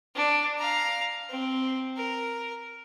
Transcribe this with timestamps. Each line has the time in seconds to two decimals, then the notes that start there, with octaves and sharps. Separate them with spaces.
0.15 D4
0.58 F5 A#5
1.29 C4
1.97 A#4